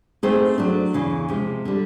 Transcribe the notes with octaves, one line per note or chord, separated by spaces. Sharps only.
A3 C4 D#4 G#4 C5
F#3 A3 D4
E2 C#3 E3
C3 F3 G#3
D3 G3